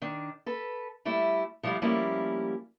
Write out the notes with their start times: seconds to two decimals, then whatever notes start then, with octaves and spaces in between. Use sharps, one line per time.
0.02 D#3 D4
0.46 A4 B4
1.05 G3 A3 E4
1.63 F3 G3 A3 E4 F4
1.82 F3 G3 A3 A#3 C#4 E4